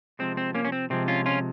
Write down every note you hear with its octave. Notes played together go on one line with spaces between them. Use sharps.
C3 F3 G#3 C4
C4
A#3 C#4
C#4
C4
C3 F3 G#3 C4
C#4 F4
C#4 F4